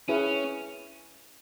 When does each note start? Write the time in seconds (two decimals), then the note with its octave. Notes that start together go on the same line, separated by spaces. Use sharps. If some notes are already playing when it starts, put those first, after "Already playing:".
0.08 C#4 E4 G#4 B4